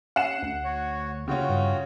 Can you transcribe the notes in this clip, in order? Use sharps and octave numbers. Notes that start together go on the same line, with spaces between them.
C#4 F#5 C7 E7
D2
F#4 C#5
C#3 C#4 F4 F#4 G5
G2